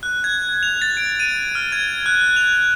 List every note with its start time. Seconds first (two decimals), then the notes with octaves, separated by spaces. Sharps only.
0.03 F#6
0.24 G#6
0.63 F7
0.82 A6
0.97 D7
1.20 D#7
1.55 F6
1.72 G#6
2.06 F#6
2.21 F#6
2.36 F7